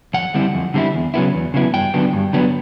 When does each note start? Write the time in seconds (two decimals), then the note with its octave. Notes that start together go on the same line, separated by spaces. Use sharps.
0.14 F2 F#5
0.34 D3 G3 C4 E4
0.54 F2
0.74 D3 G3 C4 E4
0.94 E2
1.14 C#3 F#3 B3 E4
1.34 E2
1.54 C#3 F#3 B3 E4
1.73 G2 G5
1.94 D3 F#3 B3
2.13 G2
2.33 D3 F#3 B3